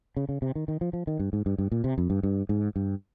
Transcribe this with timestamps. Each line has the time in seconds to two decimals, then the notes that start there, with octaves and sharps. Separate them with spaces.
0.17 C#3
0.29 C#3
0.42 C3
0.55 D#3
0.68 D#3
0.81 F3
0.93 F3
1.07 D#3
1.19 G2
1.33 G#2
1.46 G2
1.58 G2
1.72 A#2
1.84 C3
1.98 F2
2.10 G2
2.23 G2
2.49 G#2
2.76 G2